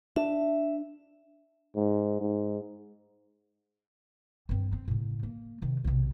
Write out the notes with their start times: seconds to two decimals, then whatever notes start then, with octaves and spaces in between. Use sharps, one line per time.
0.16 D4 E5
1.75 G#2
2.21 G#2
4.49 G2 C4
4.73 C4
4.88 A2 C#3
5.23 A#3
5.62 C3 D#3
5.84 B1 C3